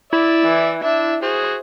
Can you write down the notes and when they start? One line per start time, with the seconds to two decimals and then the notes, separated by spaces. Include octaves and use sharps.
0.13 E4 D5 E5
0.44 E3
0.84 D4 E5
1.23 F#4 G#4 C5